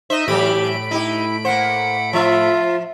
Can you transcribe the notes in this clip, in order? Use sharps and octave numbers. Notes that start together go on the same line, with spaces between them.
D#4 C5 D#5 E5
A2 E3 F#3 G4 B5 D7
D#4 E4 G4
A#3 C5 F#5
F3 F4 E5